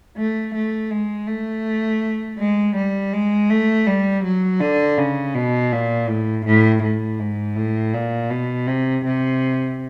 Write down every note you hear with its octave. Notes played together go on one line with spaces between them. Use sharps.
A3
A3
G#3
A3
G#3
G3
G#3
A3
G3
F#3
D3
C#3
B2
A#2
A2
A2
A2
G#2
A2
A#2
B2
C3
C3